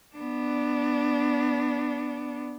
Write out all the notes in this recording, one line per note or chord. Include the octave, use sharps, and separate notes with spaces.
B3 D4